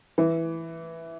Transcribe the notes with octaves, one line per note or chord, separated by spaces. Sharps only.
E3